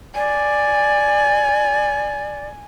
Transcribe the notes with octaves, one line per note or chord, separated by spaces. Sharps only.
D5 G#5